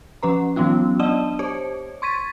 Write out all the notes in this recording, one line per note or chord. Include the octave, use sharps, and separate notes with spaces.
F3 C#4 B4 A#5
E3 F#3 B3 C#4 D#4 F4
B3 D4 D5 D#5 F#5 A5
G4 C5 C#5
C6 C#6 G#6 A6 B6 D#7